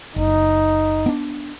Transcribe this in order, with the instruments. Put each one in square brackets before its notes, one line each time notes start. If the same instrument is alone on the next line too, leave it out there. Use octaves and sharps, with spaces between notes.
[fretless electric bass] F#1 [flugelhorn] D#4
[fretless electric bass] B3 D4